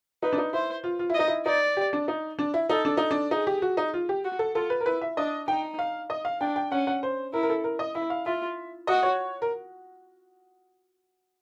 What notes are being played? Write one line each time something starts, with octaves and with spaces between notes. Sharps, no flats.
D#4 B4
D4
D#4
E4 C5
F4
F4
E4
D#5
D#4
E4
D#4 D5
G4
D4
D#4
D4
E4
D#4 A4
D4
D#4
D4
D#4 G#4
G4
F#4
D#4
F4
G4
F#4
A4
F4 A4
B4
A#4
E4 B4
E5
D4 D#5
D#4 G5
F5
D#5
F5
D4 G5
G5
C#4 F#5
F#5
C5
E4 A#4
A#4
A4
A#4
D#5
E4 E5
F5
F4 E5
F#4 D#5
C#5
A#4